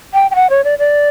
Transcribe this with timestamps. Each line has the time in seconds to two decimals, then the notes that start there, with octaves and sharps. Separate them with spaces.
0.14 G5
0.31 G5
0.35 F#5
0.50 C#5
0.64 D5
0.79 D5